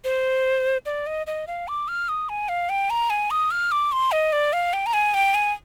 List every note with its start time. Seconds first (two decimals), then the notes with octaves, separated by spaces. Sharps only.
0.04 C5
0.86 D5
1.07 D#5
1.27 D#5
1.47 F5
1.68 D6
1.88 F6
2.09 D#6
2.29 G#5
2.49 F5
2.69 G5
2.90 A#5
3.10 G#5
3.31 D#6
3.51 F6
3.72 D6
3.92 C6
4.12 D#5
4.33 D5
4.53 F5
4.73 G5
4.86 A#5
4.93 G#5
5.14 G5
5.34 G#5